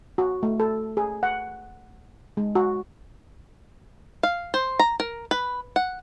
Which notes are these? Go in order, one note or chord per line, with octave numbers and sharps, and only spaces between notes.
F#4
A3
A4
G#4
F#5
G#3
F#4
F5
C5
A#5
A#4
B4
F#5